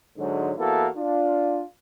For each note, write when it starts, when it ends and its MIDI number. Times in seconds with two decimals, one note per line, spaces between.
0.18 0.51 44
0.18 0.51 50
0.18 0.51 54
0.57 0.87 40
0.57 0.87 58
0.57 0.87 59
0.57 0.87 64
0.57 0.87 66
0.57 0.87 69
0.96 1.62 62
0.96 1.62 65